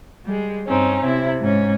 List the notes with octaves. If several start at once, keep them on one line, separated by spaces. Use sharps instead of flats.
G3 G#3
G2 C4 C#4 D#4
C3 E4
G#2 C#4